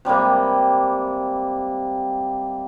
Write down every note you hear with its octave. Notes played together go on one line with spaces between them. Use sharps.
C3 G3 G#3 A#3